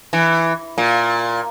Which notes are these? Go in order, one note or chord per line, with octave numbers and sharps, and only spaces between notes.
E3
A#2